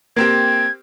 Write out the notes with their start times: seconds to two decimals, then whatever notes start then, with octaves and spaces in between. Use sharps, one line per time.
0.16 A#3 C4 G4 G#6